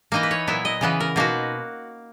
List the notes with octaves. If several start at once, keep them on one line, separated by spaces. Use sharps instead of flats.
E3 A#3 D#4 D#5
B4
C#5
A#2 F#3 B3 E4 E5
D#5
C#3 E3 B3 B4
A#4
B2 A#3 D#4 F#4